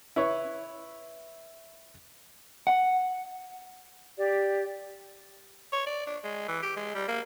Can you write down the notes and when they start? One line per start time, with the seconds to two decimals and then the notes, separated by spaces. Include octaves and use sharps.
0.16 E4 B4 C#5
2.67 F#5
4.18 G4 D5
5.72 C#5
5.86 D5
6.06 D4
6.24 G#3
6.48 E3
6.62 G4
6.76 G#3
6.94 G3
7.08 A#3